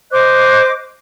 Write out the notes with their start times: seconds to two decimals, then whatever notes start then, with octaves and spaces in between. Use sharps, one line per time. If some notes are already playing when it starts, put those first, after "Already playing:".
0.11 C5 D#5 D6 F#6